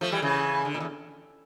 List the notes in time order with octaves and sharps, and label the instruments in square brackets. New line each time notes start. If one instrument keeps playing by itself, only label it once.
[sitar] F3 A3
E3 G3
C#3 E3
D3
A#2
E2